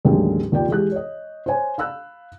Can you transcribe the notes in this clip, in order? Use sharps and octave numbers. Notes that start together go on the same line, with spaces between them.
A1 D#2 D3 F#3 G#3
D#2 F4 D5 G5
E3 G#3 G4 F#6
C#5 D#5
C5 C#5 G#5
F5 B5 E6 F#6